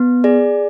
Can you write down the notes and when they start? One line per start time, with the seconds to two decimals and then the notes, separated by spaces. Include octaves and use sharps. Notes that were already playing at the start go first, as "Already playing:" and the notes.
Already playing: B3
0.24 G#4 D5